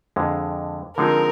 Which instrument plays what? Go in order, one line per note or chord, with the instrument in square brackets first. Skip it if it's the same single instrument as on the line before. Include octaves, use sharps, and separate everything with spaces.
[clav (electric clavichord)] F2 D3 G#3
[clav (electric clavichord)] D3 F3 G#3 C4 D#4 [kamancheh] A#4